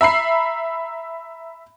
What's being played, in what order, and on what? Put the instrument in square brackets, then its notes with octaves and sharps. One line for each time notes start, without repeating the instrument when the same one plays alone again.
[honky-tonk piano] E5 A#5 B5 C7